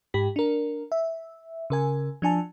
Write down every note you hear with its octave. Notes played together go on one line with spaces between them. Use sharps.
G#2 G4 B6
D4 A#4
E5
C#3 A#4 G#5
F3 D4 G#5 A5